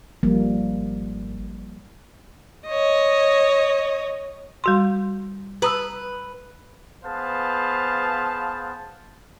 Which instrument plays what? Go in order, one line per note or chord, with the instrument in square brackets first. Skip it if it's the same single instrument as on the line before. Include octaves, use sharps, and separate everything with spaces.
[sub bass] G#1 [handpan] F3 G3 A#3
[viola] C#5 D#5
[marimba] G3 F#4 C6
[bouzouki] B4 [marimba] A#5 D#6 E6
[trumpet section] B3 G#4 B4 C5 F5 A5